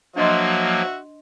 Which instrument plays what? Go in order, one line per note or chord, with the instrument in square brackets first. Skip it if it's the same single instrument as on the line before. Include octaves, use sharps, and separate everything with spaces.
[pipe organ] F3 F#3 A#3 [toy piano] D4 D#5 C6 [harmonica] F#4 E5